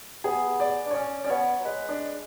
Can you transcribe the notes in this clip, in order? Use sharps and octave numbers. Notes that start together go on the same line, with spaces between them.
B3 G#4
D5
D4
C#5
C#4 D5
C#4 D5
B3 C#5
F#3
G#3 B4
D4